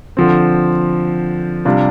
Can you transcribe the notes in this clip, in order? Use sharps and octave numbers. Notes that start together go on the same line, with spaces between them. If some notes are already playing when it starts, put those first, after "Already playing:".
D3 F3 C4
C3 G3 D4 F4